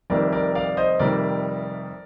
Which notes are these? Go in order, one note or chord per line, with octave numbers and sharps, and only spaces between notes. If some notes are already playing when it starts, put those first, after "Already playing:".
F1 F2 C3 D#3 G3 A#4 D5
A#4 D5
D5 F5
C5 D#5
F1 F2 C3 D#3 G3 A#4 D5